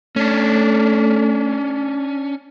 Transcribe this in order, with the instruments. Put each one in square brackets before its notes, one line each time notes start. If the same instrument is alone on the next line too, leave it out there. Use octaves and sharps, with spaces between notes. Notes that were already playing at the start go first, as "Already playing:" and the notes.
[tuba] A3 [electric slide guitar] C#4 D4